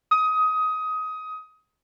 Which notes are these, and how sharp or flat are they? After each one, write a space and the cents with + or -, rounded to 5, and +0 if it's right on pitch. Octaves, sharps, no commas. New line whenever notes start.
D#6 +20